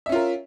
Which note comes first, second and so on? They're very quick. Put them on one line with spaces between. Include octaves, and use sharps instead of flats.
E5 C#4 F4 A#4